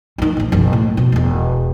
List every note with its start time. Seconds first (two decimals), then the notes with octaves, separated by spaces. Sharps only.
0.18 D#3 F3
0.37 A#1 A#2
0.52 F#1 B1
0.73 A2
0.97 B2
1.12 E1 E2